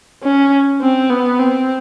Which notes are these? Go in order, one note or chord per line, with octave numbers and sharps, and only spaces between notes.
C#4
C4
B3
C4